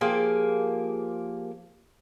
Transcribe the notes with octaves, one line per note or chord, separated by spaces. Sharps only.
F3 A#3 G4 G#4